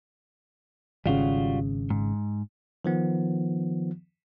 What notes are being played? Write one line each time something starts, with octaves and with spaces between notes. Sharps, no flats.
G#1 C#3 G3 F4 F#4
G#2
D#3 F3 B3